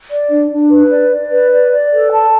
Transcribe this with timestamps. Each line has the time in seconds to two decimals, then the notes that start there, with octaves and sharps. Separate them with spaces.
0.10 D5
0.30 D4
0.50 D4
0.70 B4
0.90 D5
1.11 D5
1.32 B4
1.51 D5
1.71 D5
1.91 A4
2.12 A5